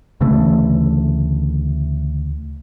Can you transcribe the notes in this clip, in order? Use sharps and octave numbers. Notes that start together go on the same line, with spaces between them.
D2 C#3 E3 A3